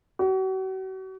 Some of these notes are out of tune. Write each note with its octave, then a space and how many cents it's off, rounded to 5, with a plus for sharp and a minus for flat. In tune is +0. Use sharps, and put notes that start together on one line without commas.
F#4 +40